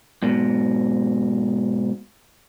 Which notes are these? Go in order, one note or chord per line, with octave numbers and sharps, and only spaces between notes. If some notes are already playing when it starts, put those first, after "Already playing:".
G#2 B2